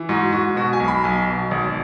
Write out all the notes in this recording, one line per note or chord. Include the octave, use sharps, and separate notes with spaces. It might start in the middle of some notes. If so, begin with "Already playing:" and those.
Already playing: E3
G#2 F#4
G#2 F#4
B2 F#4
G#5
B1
B5
B1 G#5
B2
G#1